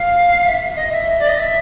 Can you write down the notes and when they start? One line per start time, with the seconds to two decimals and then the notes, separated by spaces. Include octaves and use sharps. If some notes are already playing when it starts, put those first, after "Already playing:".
Already playing: F5
0.45 E5
0.76 D#5
0.92 E5
1.19 D5
1.28 D#5
1.38 E5